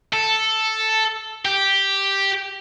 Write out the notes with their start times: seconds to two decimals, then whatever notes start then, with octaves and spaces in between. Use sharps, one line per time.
0.13 A4
1.45 G4